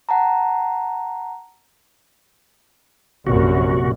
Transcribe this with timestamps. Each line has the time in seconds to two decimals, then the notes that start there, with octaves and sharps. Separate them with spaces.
0.09 F#5 A5 A#5
3.27 A#1 F#2 C3 F#4